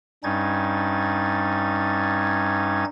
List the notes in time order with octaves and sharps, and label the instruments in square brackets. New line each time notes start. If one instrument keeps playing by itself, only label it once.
[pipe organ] G2 G3 C#4 D#4 G#6 A6